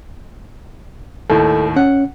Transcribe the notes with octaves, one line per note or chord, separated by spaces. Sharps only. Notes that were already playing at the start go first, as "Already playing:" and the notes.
D#2 A2 A4
C#4 F#5